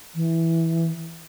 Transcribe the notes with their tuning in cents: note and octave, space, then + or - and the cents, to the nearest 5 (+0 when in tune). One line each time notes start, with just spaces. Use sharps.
E3 -5